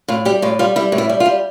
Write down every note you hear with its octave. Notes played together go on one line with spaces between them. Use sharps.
A2 F4
G3 G4
A2 F4
G3 F4
G3 E4
A2
E4
G3
F4
G3